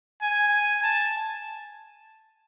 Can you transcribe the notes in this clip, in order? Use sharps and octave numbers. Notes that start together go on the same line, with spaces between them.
G#5
G#5
A5